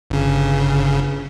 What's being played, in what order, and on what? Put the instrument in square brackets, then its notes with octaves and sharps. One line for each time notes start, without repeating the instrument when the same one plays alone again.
[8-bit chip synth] G1 C#3